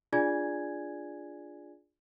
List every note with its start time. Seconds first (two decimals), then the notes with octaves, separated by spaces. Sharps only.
0.13 D4 F4 G#4 D5 G#5 G#6